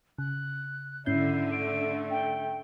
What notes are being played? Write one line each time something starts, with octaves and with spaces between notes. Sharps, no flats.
C#3 F#6
G#2 D3 C#4 E4 G6 C7
A3 D7
G5